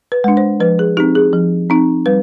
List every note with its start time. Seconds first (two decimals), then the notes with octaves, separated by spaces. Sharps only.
0.12 B4
0.24 G#3 D4
0.37 C5
0.60 F3 B4
0.79 G#4
0.97 C4 D#4 G4
1.15 G#4
1.33 F3
1.70 C4 D#4
2.06 G3 B4